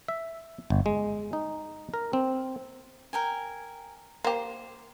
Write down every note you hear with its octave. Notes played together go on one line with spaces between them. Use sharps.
E5
G1
G#3
D#4
A#4
C4
A#4 G5 G#5
A#3 G4 C5